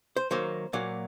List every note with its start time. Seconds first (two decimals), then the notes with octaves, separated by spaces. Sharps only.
0.17 C5
0.31 D#3 F#3 A#3 C5
0.73 A#2 F#3 A#3